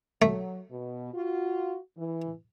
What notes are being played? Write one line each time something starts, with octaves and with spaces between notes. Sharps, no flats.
F#3 A3
B2
F4 F#4
E3